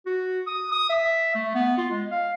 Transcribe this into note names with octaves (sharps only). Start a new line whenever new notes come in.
F#4
D#6
D#6
E5
A3
B3
F4
G#3
F5